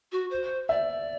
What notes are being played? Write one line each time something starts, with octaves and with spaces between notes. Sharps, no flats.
F#4
C5
D5 E5